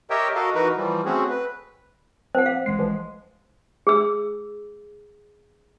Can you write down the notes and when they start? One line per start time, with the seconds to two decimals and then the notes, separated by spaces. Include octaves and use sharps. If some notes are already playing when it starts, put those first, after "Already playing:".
0.10 G4 A#4 C#5 D#5 E5 G5
0.35 F#4 A4 A#4 D#5 F5
0.55 E3 D#4 F#4 A#4 B4
0.77 E3 F3 G3
1.05 A3 C4 C#4 F#4 G#4
1.29 B4
2.35 F3 C4 C5 F#5
2.46 F5
2.66 A1 G#3 C7
2.79 E3 F3
3.87 G#4 E6